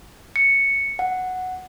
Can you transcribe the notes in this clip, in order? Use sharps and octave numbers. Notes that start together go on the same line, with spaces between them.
C#7
F#5